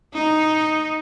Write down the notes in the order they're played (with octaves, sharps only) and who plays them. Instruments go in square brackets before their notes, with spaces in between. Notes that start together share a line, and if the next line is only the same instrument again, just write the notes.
[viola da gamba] D#4